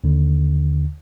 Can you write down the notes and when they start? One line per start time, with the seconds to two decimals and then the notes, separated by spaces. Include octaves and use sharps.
0.04 D#2 D3